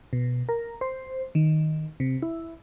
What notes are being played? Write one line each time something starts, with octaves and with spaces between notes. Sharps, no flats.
B2
A#4
C5
D#3
C3
E4